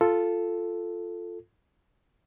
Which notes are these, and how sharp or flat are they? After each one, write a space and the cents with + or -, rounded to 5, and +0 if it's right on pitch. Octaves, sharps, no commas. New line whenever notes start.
F4 +0 A4 +0